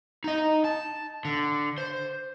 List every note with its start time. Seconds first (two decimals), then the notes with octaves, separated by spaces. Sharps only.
0.24 D#4 D#5
0.65 A5
1.25 D3
1.78 C5